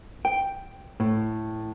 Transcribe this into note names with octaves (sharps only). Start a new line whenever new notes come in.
G5
A2